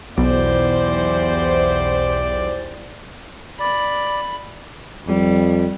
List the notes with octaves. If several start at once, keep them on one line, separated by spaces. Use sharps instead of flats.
B1 E2 G4 C5 D5
D5 B5
F2 G3